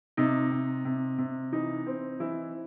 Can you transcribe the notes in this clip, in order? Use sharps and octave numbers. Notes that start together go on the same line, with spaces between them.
C3 D#4
C3
C3
C3
E3 D#4
C4
E3 E4